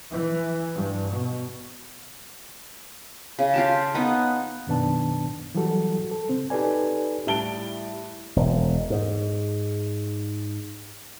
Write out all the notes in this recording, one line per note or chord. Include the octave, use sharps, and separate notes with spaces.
E3
G2
B2
C#3
F4 G4 A5
B3 D#4
F#2 B2 D#3 B3 D4 A5
E3 F#3 G3 F#4 A4
A4
C#3 C4
D#4 G4 A4 B4 D5 G#5
A2 G3 A5 D7 G7
E1
G#2